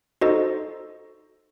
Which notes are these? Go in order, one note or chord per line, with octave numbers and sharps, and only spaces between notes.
D#4 F#4 A4 C5 D#5